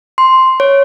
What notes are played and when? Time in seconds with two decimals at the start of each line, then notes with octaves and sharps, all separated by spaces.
0.18 C6
0.60 C#5